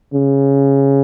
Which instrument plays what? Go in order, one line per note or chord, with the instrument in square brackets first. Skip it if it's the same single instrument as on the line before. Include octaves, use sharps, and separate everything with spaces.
[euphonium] C#3